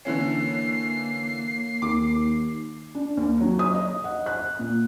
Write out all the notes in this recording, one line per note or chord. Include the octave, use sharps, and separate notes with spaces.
D3 E3 A#3 C#4 C7
D#2 D6
D4
D#2
F#3
D#6
D#5
F#5
F#6
A#2